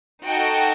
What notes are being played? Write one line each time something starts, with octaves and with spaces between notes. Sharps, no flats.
D#4 F#4 A4 G5